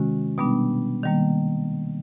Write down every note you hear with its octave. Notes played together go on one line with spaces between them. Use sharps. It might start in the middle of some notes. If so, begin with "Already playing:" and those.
Already playing: C3 D#3 G#3 C#4 F#4
B2 G3 B3 D4
D#3 G3 A#3